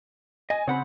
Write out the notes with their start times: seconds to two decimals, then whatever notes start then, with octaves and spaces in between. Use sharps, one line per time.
0.50 D#5 G#5
0.68 C#3 C4 F#5 B5